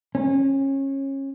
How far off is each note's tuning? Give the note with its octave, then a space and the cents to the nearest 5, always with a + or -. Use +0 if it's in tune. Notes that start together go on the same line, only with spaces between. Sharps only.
C#4 -25